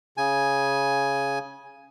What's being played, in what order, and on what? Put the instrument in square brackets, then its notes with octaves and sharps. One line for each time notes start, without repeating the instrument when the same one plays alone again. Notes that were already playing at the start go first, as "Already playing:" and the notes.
[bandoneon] C#3 G#5